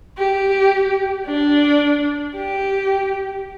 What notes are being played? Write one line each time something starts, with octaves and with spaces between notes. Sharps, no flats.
G4
D4
G4